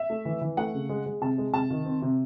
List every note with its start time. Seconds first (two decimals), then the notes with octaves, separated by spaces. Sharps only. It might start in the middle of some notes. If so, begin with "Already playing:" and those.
Already playing: E5
0.10 A3
0.25 E3
0.41 E3
0.57 A3 F#5
0.74 C#3
0.89 G#3
1.06 G#3
1.21 C3 A5
1.38 G#3
1.53 C3 A5
1.70 D#3
1.85 C4
2.02 C3